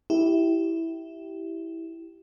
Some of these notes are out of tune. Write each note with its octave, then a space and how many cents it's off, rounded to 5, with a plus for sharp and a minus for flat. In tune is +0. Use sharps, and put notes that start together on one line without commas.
E4 -5 G4 -15